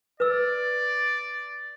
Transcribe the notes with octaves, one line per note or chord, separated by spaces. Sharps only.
B4 D5 E6